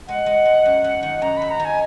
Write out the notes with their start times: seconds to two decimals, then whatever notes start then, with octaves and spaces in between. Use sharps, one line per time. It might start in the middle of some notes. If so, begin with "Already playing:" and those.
0.08 G#3 F#5
0.26 G#3
0.45 G#3
0.66 F#2
0.84 F#2
1.03 D#3
1.22 F#2 A#5
1.37 F#2 B5
1.50 A#5
1.60 D#3
1.65 G#5